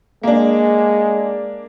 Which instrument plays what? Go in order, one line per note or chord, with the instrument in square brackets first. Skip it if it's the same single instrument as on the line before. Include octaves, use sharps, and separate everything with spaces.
[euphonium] G#3 [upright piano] A#3 D4